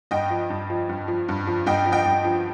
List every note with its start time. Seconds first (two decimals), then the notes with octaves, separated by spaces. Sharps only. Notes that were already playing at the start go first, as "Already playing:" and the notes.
0.11 G2 D#5 G5
0.30 F3
0.50 G2
0.70 F3
0.89 G2
1.08 F3
1.29 G2
1.47 F3
1.66 G2 D#5 G5
1.86 F3
1.92 D#5 G5
2.05 G2
2.25 F3